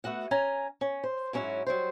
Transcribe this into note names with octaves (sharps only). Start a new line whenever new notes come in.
A3 B3 F#4 F#5
C#4 G#5 A#5
C#4
C5
G#2 F#3 C#4 E4 F#4
F#3 G3 C5